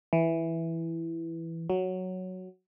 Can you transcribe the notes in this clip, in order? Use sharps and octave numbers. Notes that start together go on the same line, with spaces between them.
E3
F#3